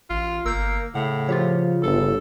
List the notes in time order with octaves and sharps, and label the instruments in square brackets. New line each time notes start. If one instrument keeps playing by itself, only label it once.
[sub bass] A1 [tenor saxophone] F4
[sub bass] G1 [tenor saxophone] A#3 [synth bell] E6 G6
[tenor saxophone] A2 [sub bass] C#3 [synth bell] F#5
[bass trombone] F3 [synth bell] F4 G4 C#5
[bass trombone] G1 [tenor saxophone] A4